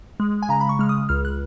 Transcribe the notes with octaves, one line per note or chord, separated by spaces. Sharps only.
G#3
G#5
C#3 A#5
B5
C#6
G#3 F6
D#6
C#2 F6
F#6